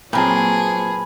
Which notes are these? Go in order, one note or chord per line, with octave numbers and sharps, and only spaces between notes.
A#2 F#3 A#3 C4 G#4 B4 A5